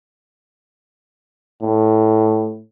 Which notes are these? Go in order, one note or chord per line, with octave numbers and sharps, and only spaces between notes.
A2